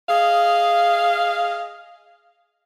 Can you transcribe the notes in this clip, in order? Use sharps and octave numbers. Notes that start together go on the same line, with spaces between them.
G#4 D#5 F5